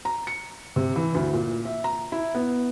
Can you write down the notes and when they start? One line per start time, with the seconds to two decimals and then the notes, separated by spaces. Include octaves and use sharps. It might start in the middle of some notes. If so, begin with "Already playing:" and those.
0.05 A#5
0.27 C#7
0.76 C3
0.96 E3
1.15 D2
1.33 A#2
1.65 E5
1.84 A#5
2.12 E4
2.35 B3